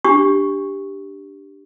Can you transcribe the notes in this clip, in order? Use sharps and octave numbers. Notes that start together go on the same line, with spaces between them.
D4 G4 C#6